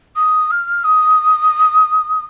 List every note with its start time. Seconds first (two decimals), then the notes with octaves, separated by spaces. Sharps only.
0.16 D#6
0.51 F6
0.84 D#6